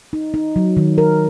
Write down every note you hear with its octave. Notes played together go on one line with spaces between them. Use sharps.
D#4
D#4
F#3
D#3
A#4